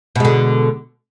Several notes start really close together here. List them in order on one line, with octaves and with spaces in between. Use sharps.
B2 G#3 D3